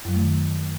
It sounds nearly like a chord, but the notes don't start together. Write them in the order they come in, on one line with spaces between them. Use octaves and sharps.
F#2 F#3 G3 A3 D#3